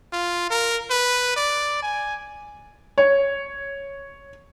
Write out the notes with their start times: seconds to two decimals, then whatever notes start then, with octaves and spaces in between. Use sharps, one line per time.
0.13 F4
0.51 A#4
0.90 B4
1.36 D5
1.83 G#5
2.98 C#5